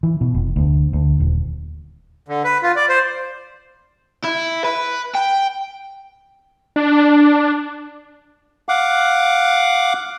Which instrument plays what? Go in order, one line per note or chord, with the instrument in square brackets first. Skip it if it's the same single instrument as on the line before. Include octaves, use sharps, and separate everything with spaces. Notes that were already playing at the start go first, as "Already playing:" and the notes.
[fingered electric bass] E3
B2
F1
D2
D2
D#1
[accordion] D3
B4
F4
D5
C5
[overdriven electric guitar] E4
B4
G5
[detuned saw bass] D4
[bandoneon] F5 F#5 D6